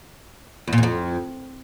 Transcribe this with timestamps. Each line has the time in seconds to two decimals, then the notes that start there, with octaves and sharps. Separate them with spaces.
0.67 E2
0.73 A#2
0.78 E2
0.83 F2